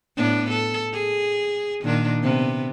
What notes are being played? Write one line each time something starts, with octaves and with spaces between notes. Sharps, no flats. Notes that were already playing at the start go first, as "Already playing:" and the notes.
A2 B3 D4
A4
G#4
A#2 D#3 D4
C3 B3